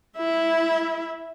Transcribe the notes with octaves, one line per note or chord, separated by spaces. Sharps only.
E4 E5